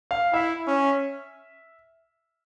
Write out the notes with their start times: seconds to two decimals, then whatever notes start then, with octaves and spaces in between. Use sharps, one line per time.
0.11 F5
0.33 E4 E5
0.67 C#4